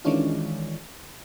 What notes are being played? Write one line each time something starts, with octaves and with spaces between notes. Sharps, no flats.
D#3 E3 G#3 C#4 D4 F4